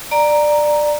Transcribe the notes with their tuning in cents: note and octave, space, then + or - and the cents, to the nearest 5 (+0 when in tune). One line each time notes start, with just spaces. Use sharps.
D5 +15 A#5 +0